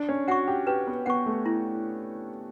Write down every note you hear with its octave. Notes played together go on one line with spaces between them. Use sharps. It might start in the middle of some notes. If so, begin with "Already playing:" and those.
Already playing: D4
C#4
F#4 F#5 C#6
G4
G4 B4
B3
B3 F#5 C#6
A3
E4